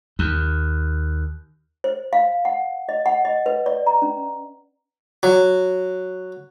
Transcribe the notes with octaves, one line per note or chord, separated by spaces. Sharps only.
D#2
C5
F5
F#5
D#5
F#5
D#5
B4
D5
A#5
C#4
F#3